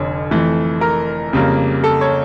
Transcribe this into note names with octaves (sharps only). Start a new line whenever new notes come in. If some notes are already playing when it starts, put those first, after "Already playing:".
Already playing: F1 F2 D3 C#5
F2 E3 A3
A#4
F2 C#3 G3 A#3
A4
C#5